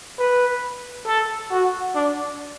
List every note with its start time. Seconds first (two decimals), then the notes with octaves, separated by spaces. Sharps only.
0.19 B4
1.06 A4
1.51 F#4
1.95 D4